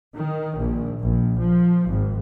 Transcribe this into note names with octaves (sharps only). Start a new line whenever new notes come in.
D#3
A#1
A#1
F3
G#1